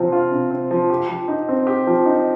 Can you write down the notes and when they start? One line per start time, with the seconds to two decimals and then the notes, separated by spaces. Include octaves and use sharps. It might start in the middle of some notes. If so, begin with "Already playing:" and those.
Already playing: C3 F3 C4 F4
0.12 F4
0.32 C3
0.51 C4
0.71 F3
0.90 G4
1.09 F3
1.28 D#4
1.48 C4
1.67 G4
1.87 F3
2.06 D#4